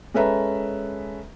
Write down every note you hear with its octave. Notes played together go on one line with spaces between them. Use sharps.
G#3 C#4 A4 B4 E5 A#5